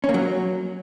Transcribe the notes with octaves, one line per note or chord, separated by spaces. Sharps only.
C#4
A#3
F#3